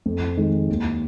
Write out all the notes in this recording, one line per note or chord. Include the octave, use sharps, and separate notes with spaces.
F2
D#3 G#3
D#2